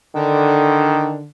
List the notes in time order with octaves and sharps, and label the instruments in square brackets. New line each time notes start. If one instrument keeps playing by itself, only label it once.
[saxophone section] D3 [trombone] D#3